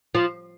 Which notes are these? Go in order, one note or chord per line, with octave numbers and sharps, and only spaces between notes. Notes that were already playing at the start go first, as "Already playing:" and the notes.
F3